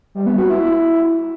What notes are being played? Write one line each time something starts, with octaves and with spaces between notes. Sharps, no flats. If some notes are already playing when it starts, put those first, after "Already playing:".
G3
B3
F#4
E4